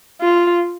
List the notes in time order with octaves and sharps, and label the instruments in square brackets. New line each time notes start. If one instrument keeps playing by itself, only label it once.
[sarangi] F4